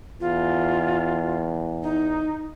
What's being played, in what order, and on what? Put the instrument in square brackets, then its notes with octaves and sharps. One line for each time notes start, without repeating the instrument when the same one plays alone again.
[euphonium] E2 [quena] F4
[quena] D#4